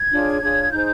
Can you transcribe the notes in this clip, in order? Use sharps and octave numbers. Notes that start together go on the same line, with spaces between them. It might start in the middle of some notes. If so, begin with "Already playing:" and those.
Already playing: G#6
D4 F4 G#4 C#5
D4 F4 G#4 C#5
D#4 G#4 C5 G6